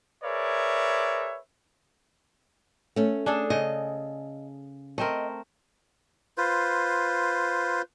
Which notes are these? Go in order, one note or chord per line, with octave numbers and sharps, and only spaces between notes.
G#4 A#4 B4 C#5 D5 E5
A3 C#4
D4 G#4 A4
C#3 D#5
A3 C4 A#4 D#5
F4 B4 C5